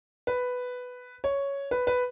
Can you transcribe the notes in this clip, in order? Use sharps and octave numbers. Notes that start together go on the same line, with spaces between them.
B4
C#5
B4
B4